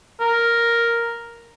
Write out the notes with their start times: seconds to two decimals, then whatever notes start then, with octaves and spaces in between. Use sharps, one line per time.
0.20 A#4